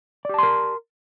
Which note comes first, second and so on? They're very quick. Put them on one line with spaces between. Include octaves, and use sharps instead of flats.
D5 G4 A5 C6 A#4